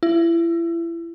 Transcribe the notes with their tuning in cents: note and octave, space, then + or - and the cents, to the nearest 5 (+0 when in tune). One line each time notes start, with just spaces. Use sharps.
E4 +30